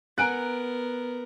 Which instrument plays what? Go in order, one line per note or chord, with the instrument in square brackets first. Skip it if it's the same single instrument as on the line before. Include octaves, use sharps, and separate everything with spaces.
[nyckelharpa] B3 A#4 [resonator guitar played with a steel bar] F#5 G#5 A#5 [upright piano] F#6 D7